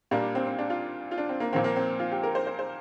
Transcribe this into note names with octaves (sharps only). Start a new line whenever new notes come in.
A#2 G3 A#3 D4
D4
C4
C4
D4
F4
F4
D4
C4
A#3
A#2 F3 A#3 C4
A#3
C4
F4
G4
A#4
C5
C5
C5